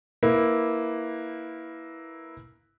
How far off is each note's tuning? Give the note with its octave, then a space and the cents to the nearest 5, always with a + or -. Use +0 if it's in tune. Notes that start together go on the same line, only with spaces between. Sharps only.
A#3 +0 E4 -10 B4 +0